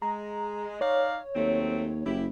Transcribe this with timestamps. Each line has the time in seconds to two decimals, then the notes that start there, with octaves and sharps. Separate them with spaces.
0.02 G#3 A#5
0.81 D#4 C#5 D5 F5
1.35 D#2 F#3 A3 C4
2.06 F#1 E4 G4